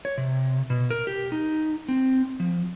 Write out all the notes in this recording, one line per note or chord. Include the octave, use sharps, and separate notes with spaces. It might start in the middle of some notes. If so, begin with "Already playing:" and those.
C#5
C3
B2
A#4
G4
D#4
C4
F3